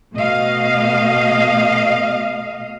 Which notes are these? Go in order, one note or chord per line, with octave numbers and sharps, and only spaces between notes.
B2 A3 D#5 F5